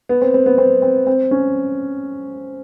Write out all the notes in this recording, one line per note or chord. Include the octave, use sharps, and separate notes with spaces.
B3
C4
C4
B3
C4
C4
C4
C#4